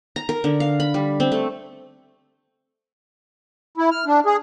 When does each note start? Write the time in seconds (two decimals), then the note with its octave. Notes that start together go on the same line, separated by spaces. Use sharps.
0.16 A#5
0.29 A#4
0.44 D3
0.60 F5
0.80 B5
0.94 G3
1.20 C4
1.32 A3
3.78 E4
3.91 F6
4.06 D4
4.26 G#4